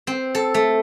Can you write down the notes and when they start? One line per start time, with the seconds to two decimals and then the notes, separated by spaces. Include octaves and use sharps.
0.07 C4
0.35 A4
0.54 A3